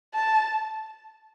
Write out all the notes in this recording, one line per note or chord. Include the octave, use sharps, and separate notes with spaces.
A5